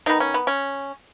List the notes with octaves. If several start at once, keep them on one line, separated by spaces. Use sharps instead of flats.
D#3 B3 D#4
C#4
B3
C#4